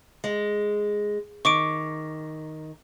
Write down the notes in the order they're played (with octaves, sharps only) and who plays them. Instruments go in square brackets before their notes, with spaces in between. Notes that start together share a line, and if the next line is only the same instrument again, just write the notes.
[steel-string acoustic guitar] G#3
[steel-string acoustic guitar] D#3 [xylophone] C#6 D6 D7